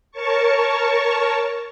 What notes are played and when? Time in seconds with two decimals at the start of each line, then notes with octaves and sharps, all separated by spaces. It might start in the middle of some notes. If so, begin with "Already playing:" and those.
0.11 A#4 C#5 A5 C#6